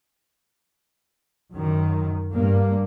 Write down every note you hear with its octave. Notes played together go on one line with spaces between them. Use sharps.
F#2 D#3
G2 A#3